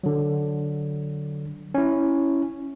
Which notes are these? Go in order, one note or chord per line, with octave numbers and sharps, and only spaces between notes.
D3 F#3
C#4 E4